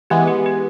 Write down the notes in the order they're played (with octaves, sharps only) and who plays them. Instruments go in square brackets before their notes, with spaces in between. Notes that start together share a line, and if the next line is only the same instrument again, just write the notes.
[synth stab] E3 G#3 B3 [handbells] G4
[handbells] G4
G4